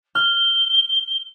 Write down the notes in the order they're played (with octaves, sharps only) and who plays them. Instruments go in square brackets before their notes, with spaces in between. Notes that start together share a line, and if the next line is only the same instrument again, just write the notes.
[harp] F6 [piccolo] G7